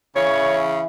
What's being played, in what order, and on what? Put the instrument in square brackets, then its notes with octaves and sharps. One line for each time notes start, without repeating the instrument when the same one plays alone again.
[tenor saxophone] C#3 [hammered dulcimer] E3 [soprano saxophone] C#5